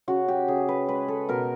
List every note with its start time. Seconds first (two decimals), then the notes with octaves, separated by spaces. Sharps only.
0.08 C#3 F#4
0.28 G4
0.48 C#3 G#4
0.69 B4
0.88 G#3 B4
1.08 A4
1.29 B2 A#4